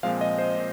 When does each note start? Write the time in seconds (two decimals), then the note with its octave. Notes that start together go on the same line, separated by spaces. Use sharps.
0.03 A#2 F3 G#3 C4 F5
0.21 D#5
0.38 C5
0.57 A#2